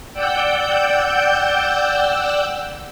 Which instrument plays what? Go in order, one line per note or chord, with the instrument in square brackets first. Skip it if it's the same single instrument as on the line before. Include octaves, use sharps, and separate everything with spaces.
[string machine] D5 F#5 G5 E6 G6